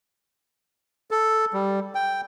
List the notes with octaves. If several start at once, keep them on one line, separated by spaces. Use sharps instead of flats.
A4
G3
G5